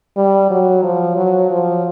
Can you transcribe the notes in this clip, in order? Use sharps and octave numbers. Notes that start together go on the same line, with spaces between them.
G3
F#3
F3
F#3
F3